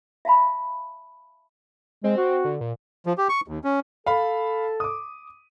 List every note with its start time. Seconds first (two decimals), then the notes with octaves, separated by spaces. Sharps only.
0.25 E5 F5 A5 B5
2.04 G#3 C4
2.17 F#4
2.45 D3
2.61 A#2
3.06 F3
3.18 G4
3.29 C#6
3.48 D#2
3.64 C#4
4.06 A4 F5 B5
4.80 D6 D#6